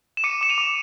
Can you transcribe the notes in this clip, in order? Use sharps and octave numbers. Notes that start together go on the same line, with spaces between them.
E7
D6 C#7 D#7
D6 E7
D#7 F7
D6